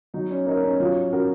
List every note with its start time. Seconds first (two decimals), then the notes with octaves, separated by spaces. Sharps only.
0.14 F#3 D#4
0.31 C#4
0.46 A#3 C#4 D#4 A#4
0.64 C#4
0.80 F#3 F4
1.13 C#4 F#4 A#4